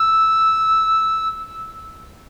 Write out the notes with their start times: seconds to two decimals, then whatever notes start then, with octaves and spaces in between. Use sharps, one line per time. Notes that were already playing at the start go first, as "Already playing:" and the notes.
Already playing: E6